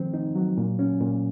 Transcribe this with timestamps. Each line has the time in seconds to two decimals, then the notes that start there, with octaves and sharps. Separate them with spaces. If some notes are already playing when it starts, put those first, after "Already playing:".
Already playing: D#3 F3 C4
0.14 D#4
0.35 F#3
0.58 A#2
0.79 C#4
1.00 A#2